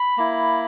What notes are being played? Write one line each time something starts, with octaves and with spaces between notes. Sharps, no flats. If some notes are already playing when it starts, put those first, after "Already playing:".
Already playing: B5
A#3 E4